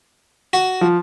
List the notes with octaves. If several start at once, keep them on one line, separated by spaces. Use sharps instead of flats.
F#4
F3